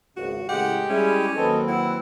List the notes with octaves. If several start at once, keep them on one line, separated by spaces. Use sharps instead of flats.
G#1 C#2 F#4
A2 C#3 E3 G#3 G4 F#5 G5
G3 C#4 E4 G#4
D#2 F#3 C4 A4 B4 D#5
E4 F#5